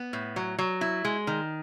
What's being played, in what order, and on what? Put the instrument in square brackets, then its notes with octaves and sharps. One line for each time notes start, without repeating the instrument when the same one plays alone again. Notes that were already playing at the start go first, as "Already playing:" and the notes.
Already playing: [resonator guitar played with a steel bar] B3
A2
F#3
F#3
E4
G#3
D#3